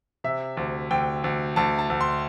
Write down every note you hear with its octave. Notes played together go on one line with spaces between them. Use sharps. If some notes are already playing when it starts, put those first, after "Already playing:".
C3 E5
D2
D2 G5
D2
D2 A5
A5
D2
C6